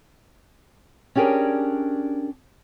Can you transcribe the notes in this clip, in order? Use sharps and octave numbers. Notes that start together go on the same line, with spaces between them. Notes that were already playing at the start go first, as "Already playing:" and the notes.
C#4 D4 G4 G#4 A#4 D5